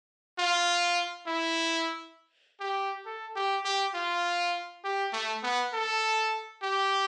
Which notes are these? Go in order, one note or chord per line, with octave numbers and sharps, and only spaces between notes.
F4
E4
G4
A4
G4
G4
F4
G4
A3
B3
A4
G4